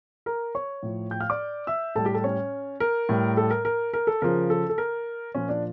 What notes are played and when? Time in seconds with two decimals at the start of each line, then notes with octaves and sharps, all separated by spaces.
0.26 A#4 A#5
0.55 C#5 C#6
0.83 A2 F3
1.11 G5 G6
1.21 F5 F6
1.30 D5 D6
1.67 E5 E6
1.95 A2 G3 A4 A5
2.05 G4 G5
2.14 A4 A5
2.24 C#4 C#5
2.80 A#4
3.09 A2 G3
3.37 A4
3.50 A#4
3.65 A#4
3.94 A#4
4.07 A4
4.22 C#3 F3 A#4
4.50 A4
4.69 A4
4.78 A#4
5.35 A#2 F3 C#4 C#5
5.49 D4 D5